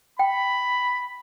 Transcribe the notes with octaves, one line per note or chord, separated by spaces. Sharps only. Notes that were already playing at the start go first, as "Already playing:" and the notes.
G5 B5